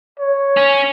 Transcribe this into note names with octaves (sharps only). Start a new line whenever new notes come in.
C#5
C#4